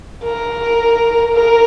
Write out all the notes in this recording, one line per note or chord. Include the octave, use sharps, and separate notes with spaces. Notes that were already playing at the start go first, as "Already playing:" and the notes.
A#4
A#4